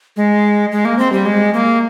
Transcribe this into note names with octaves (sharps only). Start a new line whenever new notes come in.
G#3
G#3
A#3
C4
G3
G#3
A#3